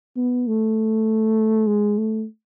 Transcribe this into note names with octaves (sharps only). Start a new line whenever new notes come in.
B3
A3
G#3
A3